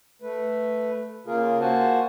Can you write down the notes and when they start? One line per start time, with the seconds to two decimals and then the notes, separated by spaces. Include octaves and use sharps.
0.22 A3 B4
1.27 C#3 A#3 F4 G#4 A#4
1.60 A#3 F#4 C5 F#5 G#5 A5